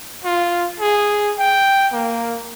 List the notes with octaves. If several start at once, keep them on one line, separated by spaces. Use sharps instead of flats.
F4
G#4
G5
A#3